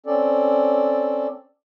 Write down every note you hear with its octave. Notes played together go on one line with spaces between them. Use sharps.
C4 C#4 A4 D5